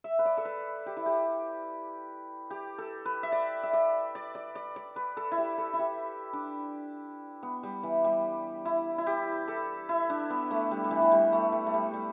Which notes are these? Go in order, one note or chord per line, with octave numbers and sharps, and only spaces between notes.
E5
B4
D5
A4
B4
G4
E4
G4
G4
A4
B4
E5
D5
E5
D5
D5
D5
D5
D5
B4
A4
E4
G4
A4
E4
G4
D4
B3
G3
E3
G3
E4
E4
G4
A4
E4
D4
B3
A3
G3
G3
E3
E3
G3
A3
G3
A3
G3
G3